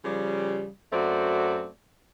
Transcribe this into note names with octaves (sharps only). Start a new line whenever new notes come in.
C#3 F3 G3
F#2 A3 C4 F#4 D5